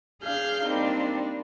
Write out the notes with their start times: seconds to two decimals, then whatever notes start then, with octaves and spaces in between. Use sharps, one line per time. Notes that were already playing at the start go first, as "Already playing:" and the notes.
0.22 D4 G#4 F5 F6 G6
0.65 G3 A#3 C4 D4 D#4